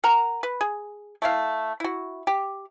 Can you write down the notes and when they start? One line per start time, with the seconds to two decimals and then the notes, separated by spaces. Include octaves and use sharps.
0.04 A#4 F#5 A#5
0.43 B4
0.61 G#4
1.22 A3 E4 F5
1.80 E4 F#4
2.27 G4